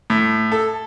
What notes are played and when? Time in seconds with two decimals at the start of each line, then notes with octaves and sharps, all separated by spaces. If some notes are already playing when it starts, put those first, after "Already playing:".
0.10 A2
0.52 A4